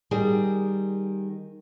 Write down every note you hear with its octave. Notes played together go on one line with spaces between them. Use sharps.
D#3 G3 G#4